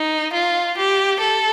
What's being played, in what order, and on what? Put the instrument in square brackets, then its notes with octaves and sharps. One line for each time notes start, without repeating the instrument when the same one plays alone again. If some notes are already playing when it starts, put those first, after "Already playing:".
Already playing: [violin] D#4
F4
G4
A4